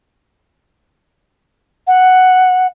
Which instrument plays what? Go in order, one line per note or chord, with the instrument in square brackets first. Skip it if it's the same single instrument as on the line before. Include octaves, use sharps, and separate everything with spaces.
[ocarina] F#5